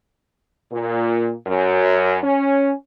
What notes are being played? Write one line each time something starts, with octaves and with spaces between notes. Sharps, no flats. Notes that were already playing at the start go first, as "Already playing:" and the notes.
A#2
F#2
C#4